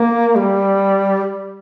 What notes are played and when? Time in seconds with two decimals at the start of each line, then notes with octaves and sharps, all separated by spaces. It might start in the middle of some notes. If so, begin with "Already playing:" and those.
Already playing: A#3
0.35 G3